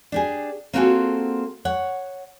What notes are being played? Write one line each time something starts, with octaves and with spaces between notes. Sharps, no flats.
D4 G4 G#4
A#3 C4 F4 F#4 G#4 A4
C#5 F#5